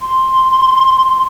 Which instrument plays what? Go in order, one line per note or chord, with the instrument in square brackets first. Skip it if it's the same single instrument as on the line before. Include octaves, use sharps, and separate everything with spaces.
[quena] C6